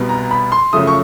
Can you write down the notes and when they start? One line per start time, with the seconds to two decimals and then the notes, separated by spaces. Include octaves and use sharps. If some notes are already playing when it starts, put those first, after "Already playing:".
Already playing: C2 B2 G3 B3
0.09 A#5
0.31 B5
0.52 C6
0.73 F#2 C#3 F3 A3 D#6
0.87 C#6